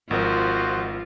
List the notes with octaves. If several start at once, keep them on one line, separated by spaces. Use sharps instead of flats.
G#1 F3 F4 F#4 A#4 C5 D#5